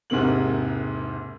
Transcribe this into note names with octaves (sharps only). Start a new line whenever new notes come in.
E1 G#2 C3 A#3 F#7